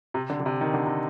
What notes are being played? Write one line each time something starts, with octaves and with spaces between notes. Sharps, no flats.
C3
D3
D3
C3
D#3
D3
C3